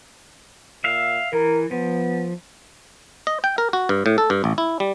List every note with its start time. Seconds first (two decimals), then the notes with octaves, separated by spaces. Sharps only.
0.84 A#2 E5 F5
1.33 E3 A#4
1.71 F3 B3
3.27 D#5
3.44 G5
3.58 A#4
3.73 F#4
3.89 G2
4.06 A2
4.18 A4
4.30 G2
4.44 A1
4.58 E4
4.80 G3